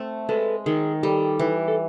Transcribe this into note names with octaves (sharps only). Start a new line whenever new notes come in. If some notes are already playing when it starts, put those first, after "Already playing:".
Already playing: A3 C4
G#3 A4 B4
D#3 G#4 A#4
G3 G4 A4
E3
A4